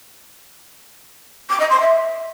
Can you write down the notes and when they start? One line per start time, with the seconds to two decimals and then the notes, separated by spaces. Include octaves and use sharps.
1.49 D6
1.59 D#5
1.70 C6
1.80 E5